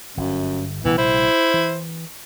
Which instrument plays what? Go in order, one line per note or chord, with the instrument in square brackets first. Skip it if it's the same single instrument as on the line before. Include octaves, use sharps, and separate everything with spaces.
[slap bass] G1 [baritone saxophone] F#2
[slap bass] A#1 C3 G3 [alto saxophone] E3 [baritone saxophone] B3
[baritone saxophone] E4 [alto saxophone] C5
[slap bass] E3